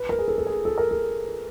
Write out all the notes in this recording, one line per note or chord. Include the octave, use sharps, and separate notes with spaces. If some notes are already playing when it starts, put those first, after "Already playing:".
Already playing: B4
A#4
G#4
A4
A4
G#4
A4
A#4
A4